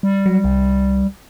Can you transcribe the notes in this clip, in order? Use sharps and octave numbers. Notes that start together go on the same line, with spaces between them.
G3
F#3
C2